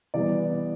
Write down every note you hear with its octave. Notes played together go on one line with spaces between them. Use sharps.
E3 G3 B3 D5